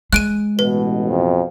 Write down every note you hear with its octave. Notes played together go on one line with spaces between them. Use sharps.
G#3 F#6 D7 D#7
A1 B2 B4
F2